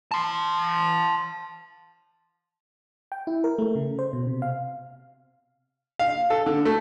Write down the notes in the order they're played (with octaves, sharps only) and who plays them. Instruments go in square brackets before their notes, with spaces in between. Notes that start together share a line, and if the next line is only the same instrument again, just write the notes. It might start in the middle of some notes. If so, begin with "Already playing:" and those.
[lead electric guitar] A5 C6
[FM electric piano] G5
E4
A#4
A3
C#3
C5
B2
C3
F5
[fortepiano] F5
A4
D3
A3